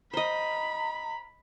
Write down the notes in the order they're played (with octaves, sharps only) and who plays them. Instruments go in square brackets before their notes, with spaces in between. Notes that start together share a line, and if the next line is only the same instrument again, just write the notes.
[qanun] C5 D#5 [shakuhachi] A#5 [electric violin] B5